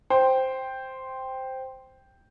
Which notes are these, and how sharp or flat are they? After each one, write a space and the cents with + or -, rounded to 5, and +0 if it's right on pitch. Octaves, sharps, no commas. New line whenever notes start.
C5 +0 G5 +0